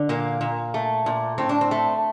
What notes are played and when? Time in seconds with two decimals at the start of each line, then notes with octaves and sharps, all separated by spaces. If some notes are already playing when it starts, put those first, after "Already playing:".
Already playing: D3
0.09 A#2 A#3
0.41 A#2
0.74 A3
1.06 A#2
1.38 A2 C4
1.49 D4
1.61 C4
1.71 A3